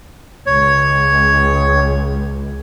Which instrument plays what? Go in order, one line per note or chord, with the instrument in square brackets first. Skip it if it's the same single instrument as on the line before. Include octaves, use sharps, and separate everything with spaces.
[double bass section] C#2 [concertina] C#5